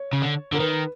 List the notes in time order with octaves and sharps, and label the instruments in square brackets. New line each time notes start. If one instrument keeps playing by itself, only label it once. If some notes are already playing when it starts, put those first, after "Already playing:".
Already playing: [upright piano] C#5
[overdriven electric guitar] C#3
D3
[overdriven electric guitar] D3 [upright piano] A#4
[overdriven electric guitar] D#3 [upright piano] B4